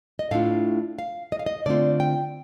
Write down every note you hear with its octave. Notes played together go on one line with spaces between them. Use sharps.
D#5
A2 A3 D4 F4 F5
F5
D#5
F5
D#5
D3 A3 C4 F4 D5
G5